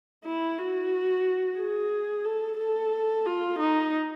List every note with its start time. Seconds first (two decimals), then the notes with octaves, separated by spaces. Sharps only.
0.25 E4
0.58 F#4
1.58 G#4
2.25 A4
2.59 A4
3.26 F4
3.59 D#4